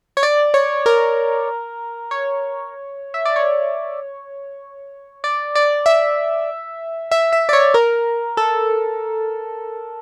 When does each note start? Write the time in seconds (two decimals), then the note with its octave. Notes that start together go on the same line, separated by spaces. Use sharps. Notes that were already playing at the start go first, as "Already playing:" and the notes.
0.17 C#5
0.23 D5
0.54 C#5
0.86 A#4
2.11 C#5
3.14 E5
3.25 D5
3.36 C#5
5.24 D5
5.55 D5
5.86 E5
7.11 E5
7.33 E5
7.49 D5
7.53 C#5
7.74 A#4
8.37 A4